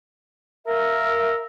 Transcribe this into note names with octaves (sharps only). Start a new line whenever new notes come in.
A#4 E5 F5 E6